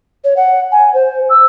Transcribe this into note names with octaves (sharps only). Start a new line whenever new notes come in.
C#5
F#5
G#5
C5
E6